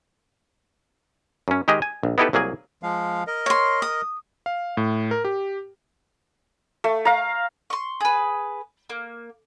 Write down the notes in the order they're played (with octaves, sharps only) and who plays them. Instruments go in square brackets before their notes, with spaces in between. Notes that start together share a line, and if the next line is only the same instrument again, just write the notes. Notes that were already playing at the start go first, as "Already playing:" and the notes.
[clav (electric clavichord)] F#2 C#4
D#3 G#3 G4 G#4 D#5
G#5
A#1
B3 D#4 E4 G4 A4 B4
C2 F#3 A#3 G#4 G#5
[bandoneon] F3 G#3 F5
A#4 D#5
[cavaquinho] C#5 C6
D#6
[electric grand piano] F5
A2
A#4
G4
[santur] A3
F5 A#5
[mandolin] C6 C#6
G#4 B4
A#3